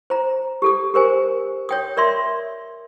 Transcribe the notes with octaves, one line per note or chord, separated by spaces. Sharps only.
C5 A#5
G4 A4 D#6
G4 A#4 C5 G#5
C#5 G5 D#6
A#4 D5 E5 C6